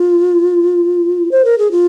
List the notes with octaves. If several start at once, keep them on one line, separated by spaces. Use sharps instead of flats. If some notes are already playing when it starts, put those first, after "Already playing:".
Already playing: F4
C5
A#4
G#4
F4